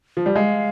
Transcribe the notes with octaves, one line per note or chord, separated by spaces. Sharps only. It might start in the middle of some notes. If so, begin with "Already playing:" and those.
F3
G3
G#3 F5